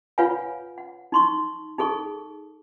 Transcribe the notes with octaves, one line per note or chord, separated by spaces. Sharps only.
F4 B4 C#5 F5 F#5 G#5
F#5
D#4 C6 C#6
D#4 G#4 A4 C#6